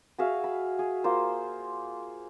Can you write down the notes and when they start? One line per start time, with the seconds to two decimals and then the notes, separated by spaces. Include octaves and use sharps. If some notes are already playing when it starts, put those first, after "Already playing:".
0.18 F#4 G#4 E5 F5
0.44 B5
0.79 G#4
1.04 A#3 F4 C5